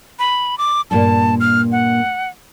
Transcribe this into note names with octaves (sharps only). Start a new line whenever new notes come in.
B5
D6
G2 A#2 A#3 A5
F6
F#5